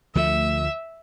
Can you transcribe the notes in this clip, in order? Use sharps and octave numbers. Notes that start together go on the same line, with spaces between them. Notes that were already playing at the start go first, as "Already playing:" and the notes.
D2 F3 A3 E5